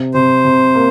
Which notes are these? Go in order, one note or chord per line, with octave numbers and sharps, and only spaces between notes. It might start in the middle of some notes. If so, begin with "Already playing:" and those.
Already playing: C3
C3 C5
C3
A#3